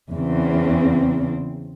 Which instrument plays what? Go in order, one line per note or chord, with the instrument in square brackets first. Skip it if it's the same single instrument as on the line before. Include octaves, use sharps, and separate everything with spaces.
[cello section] E2 C#3 C4